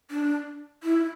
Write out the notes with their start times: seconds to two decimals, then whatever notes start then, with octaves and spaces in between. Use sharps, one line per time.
0.11 D4
0.83 E4